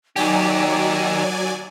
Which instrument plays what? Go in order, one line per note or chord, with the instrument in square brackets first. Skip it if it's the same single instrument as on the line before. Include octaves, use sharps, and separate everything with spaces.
[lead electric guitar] D#3 G4 [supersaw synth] F#3 D5 G#5 [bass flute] D#4